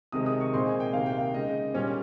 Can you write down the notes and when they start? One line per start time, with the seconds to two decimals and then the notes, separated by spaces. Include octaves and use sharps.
0.12 C3 D#3 G#3 D#6
0.26 D#6
0.40 C#6
0.53 A#2 G#3 C4 D#4 C6
0.66 G#5
0.80 G5
0.93 C3 D#3 A#3 F5
1.06 G5
1.18 F5
1.34 C#3 G#3 D#4 D#5
1.74 A#2 G3 C#4 C#5